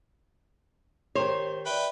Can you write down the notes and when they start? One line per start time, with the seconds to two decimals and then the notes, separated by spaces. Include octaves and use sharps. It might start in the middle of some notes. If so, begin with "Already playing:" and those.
1.15 D#3 G4 C5 C#5
1.66 B4 D5 E5 G5